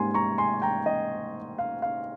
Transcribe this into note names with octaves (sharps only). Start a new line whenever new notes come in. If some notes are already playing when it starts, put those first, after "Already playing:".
Already playing: G#2 G3 A#3 G#5 C6
A#5 C#6
G#5 C6
G5 A#5
D#5 G5
F5
F5